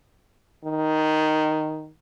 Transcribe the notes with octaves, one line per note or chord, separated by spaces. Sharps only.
D#3